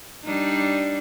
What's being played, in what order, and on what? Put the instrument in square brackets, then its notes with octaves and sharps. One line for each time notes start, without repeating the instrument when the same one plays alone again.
[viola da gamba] G3 D4 D#4